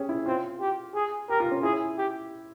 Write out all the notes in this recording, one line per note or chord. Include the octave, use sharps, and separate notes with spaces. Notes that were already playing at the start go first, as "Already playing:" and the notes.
Already playing: C#4 G4 G#4
E4
C4 F4
G4
G#4
G4 A#4
F4
C#4
E4 G#4
G4